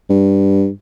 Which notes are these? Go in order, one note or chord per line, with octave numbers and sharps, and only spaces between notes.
G2